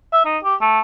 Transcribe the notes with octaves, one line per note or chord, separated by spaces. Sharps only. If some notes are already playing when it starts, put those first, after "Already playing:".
E5
D#4
G4
A3